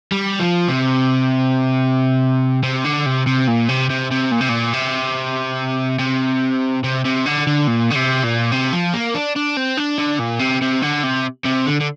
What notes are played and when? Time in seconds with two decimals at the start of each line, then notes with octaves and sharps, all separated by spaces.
0.12 G3
0.40 F3
0.68 C3
2.63 C3
2.85 D3
3.06 C3
3.27 C3
3.48 A#2
3.69 C3
3.90 C3
4.11 C3
4.31 A#2
4.41 C3
4.49 A#2
4.74 C3
5.99 C3
6.84 C3
7.05 C3
7.26 D3
7.47 D3
7.68 A#2
7.91 D3
7.96 C3
8.24 A#2
8.52 C3
8.73 F3
8.93 A#3
9.14 D4
9.36 D4
9.57 C4
9.77 D4
9.98 D3
10.20 A#2
10.40 C3
10.62 C3
10.82 D3
11.03 C3
11.45 C3
11.67 D3
11.81 D3